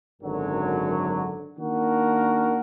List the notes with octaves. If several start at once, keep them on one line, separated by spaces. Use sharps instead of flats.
G#1 F#2 D3 F#3
D#3 A#3 D4 F#4 A#4